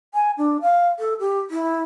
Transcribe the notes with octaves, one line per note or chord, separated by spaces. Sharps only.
G#5
D4
F5
A4
G4
E4